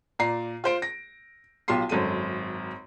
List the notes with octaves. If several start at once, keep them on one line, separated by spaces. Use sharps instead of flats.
A#2 D5 A#5 C7
F4 C5 D7
A#6
B1 F4 G4 C6 C7
G#1 F#2 A4 D#7